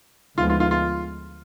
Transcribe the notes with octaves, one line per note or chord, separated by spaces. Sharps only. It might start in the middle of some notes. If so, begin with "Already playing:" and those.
D2 D3 F3 G#3 B3 F4
F4
F4
F4